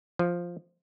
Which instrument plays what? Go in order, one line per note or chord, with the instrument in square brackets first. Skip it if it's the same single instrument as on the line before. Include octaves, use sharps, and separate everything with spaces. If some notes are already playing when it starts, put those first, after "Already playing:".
[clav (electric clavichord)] F3